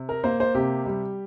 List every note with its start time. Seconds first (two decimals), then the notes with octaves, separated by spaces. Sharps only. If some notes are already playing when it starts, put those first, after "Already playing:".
Already playing: C3
0.09 A#4
0.24 A#3 C5
0.40 C5
0.55 C3 G4
0.86 G3